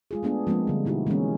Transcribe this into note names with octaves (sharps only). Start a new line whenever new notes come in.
G#3 F4 G#4
A3 B3 D4 G#4
F3 G#3 A#3 C4
D3 G3
B2 D#4 E4 F#4 G4
E3 G#3 A#3 B3 C#4